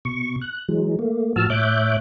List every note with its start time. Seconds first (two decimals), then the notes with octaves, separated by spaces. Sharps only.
0.05 B2 C#6
0.42 F#6
0.68 E3 F#3 G#3
0.99 A3 A#3
1.36 A2 F3 F#4 A5 E6 F6
1.50 A2 C#5 E5 D6 F#6 G6